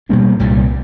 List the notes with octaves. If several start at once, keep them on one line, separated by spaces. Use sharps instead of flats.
B2 G3 A#3 D4
C2 A#2 G3